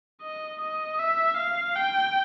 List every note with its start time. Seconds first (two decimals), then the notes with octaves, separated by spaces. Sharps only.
0.22 D#5
0.61 D#5
0.99 E5
1.37 F5
1.76 G5